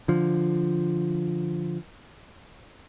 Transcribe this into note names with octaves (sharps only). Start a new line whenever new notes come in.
D3 F3